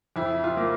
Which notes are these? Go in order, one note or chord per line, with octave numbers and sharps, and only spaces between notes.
F2 E4
F4
A#3